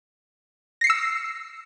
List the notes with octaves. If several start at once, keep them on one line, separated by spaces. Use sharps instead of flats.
E6 A#6 C7 C#7